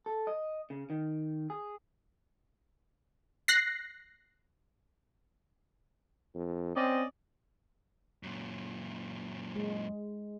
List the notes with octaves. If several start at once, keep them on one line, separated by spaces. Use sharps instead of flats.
A4
D#5
C#3
D#3
G#4
F#6 A#6 C7
F2
C4 C#4 D5 D#5
F#2 A#2
G#3